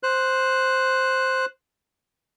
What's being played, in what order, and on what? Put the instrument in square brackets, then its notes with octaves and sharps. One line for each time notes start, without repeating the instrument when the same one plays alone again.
[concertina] C5 F#6